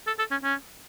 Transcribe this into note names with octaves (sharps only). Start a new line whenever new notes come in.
A4
A4
C#4
C#4